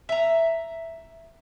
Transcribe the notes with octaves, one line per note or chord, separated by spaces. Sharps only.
E5 A#5